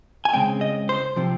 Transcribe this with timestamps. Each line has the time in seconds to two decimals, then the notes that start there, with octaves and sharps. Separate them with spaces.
0.25 G#5
0.33 C#3 G#3 C4 G5
0.61 D#5
0.89 C5
1.16 C3 F3 C4